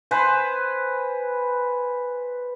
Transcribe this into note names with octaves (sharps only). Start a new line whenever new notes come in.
B4 C5 G#5